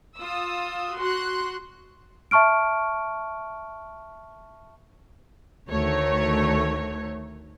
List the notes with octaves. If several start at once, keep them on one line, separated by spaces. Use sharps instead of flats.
F4 D#6 E6
F#4 C6 F#6
E5 A5 C#6 F6 D7
D2 D#3 A3 C#5